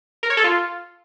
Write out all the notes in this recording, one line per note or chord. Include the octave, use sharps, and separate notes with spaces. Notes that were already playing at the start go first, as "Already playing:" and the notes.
A#4
C#5
A4
F4